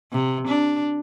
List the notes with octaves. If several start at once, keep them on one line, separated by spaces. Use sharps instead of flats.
C3
D4